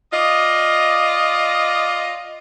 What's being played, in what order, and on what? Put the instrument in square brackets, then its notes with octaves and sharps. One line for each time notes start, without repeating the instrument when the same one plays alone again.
[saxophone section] F4 D5 D#5